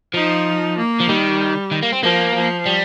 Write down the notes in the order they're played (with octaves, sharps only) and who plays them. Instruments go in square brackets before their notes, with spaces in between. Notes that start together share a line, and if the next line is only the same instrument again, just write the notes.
[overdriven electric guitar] F3 [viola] D#4
[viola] A#3
[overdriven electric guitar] F3
[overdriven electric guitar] D#3 [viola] G3
[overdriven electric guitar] D#3
A#3
C4
[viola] F3 [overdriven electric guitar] A#3
[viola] F3
[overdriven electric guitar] G3